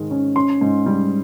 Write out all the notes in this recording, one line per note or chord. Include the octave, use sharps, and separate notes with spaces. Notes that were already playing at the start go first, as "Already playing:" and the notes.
Already playing: G#2 D#3 G#3
C#4
C#4 C6
G#2
G3